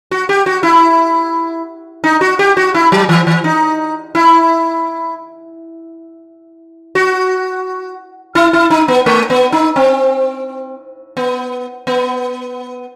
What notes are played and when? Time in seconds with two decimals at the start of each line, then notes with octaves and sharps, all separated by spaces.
0.11 F#4
0.29 G4
0.46 F#4
0.63 E4
2.04 D#4
2.21 F#4
2.39 G4
2.57 F#4
2.74 E4
2.92 F#3
3.09 E3
3.27 E3
3.44 D#4
4.15 E4
6.95 F#4
8.35 E4
8.53 E4
8.70 D#4
8.88 B3
9.06 A3
9.30 B3
9.52 D#4
9.76 C4
11.17 B3
11.87 B3